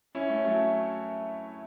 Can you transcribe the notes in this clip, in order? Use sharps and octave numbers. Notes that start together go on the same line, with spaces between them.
C#4 E4
A3 C#4
F#3 A3